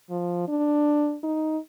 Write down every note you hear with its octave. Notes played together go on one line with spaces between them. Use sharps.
F3
D4
D#4